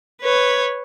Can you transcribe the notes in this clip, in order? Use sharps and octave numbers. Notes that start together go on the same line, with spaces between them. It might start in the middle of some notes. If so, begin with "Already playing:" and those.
B4 C#5